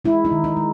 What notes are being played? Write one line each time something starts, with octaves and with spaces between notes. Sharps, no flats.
G#3 E4
D#4
D#3
D#4
G#3